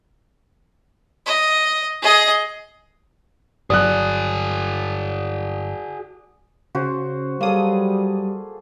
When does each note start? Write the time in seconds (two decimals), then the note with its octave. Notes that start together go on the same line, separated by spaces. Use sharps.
1.26 D#5
2.02 G#4 D#5
3.70 G1 F#3 F#4 G#4 D5 D#6 F#6
6.75 C#3 F#4 C5
7.41 F#3 G3 A#3 G#4 A4 D#6